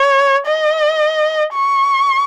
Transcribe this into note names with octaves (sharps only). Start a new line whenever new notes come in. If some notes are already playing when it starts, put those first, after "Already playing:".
Already playing: C#5
D#5
C#6